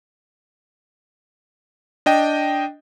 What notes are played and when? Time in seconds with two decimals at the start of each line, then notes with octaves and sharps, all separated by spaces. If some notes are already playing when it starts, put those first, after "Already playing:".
2.06 D4 D#5 G5